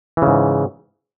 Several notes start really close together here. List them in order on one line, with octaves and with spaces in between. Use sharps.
E3 C#3 G#2